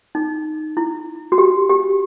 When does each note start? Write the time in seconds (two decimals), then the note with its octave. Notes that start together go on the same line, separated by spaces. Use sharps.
0.15 D#4
0.77 E4
1.32 F#4
1.38 G4
1.69 G4